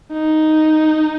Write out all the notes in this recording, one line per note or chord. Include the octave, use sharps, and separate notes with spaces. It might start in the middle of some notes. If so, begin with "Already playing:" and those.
D#4